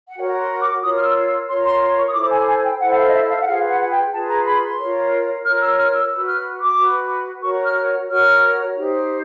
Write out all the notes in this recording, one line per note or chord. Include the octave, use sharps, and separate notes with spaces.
F#5
F#4 A#4 C#5 G5
C6
D6
F4 A#4 C#5 D#6
F6
E6
E6
F4 A#4 C#5 C6
C6
C6
C#6
D#6
E4 A4 C5 D6
G#5
G#5
G5
E4 A4 C5 F#5
F5
D#5
E5
F5
F#5
F4 G#4 B4 F5
F#5
G5
F4 G#4 B4 A5
A#5
B5
C6
F4 A#4 C#5
F4 A#4 C#5 F6
E6
F6
E6
F#4 B4 E6
F6
D6
F#4 B4
F#4 A#4 C#5 C#6
F6
F#4 A#4 C#5 F6
D#4 G4 C5